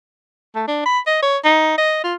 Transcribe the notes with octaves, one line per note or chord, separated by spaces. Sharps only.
A3
D4
B5
D#5
C#5
D#4
D#5
F4